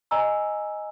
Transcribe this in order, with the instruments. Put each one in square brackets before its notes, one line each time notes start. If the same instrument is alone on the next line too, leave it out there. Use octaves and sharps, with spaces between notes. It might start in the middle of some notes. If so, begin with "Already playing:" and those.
[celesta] D#5 G#5 A#5 E6